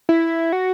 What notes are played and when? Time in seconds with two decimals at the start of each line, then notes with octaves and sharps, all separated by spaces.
0.09 E4
0.53 F#4